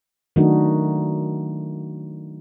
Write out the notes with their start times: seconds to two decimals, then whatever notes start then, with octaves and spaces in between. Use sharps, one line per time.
0.36 D#3 F#3 A3 D4 D#4 F#4